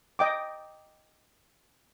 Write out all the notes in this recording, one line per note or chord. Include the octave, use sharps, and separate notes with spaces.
D#5 G5 D6